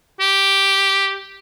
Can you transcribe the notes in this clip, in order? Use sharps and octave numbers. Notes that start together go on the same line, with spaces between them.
G4